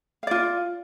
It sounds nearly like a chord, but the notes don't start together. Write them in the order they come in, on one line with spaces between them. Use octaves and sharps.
F5 D5 F4